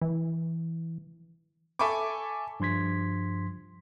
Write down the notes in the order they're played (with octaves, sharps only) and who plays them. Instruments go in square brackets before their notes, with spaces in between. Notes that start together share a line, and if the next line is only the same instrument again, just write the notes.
[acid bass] E3
[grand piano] A4 E5 G#5 B5 C#6 D6
[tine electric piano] G2 F3 C6 G#6 B6